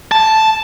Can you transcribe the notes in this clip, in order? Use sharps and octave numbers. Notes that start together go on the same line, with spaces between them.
A5